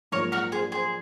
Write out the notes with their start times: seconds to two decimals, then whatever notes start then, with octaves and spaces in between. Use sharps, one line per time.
0.12 A#1 G#2 F#3 A#3 F4 A#4 C#5
0.32 F#4 A#4
0.52 G#4 C5
0.72 G#4 C5